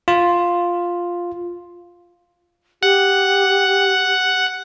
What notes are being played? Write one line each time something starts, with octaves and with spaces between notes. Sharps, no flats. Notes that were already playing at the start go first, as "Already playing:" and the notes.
F4
G4 F#5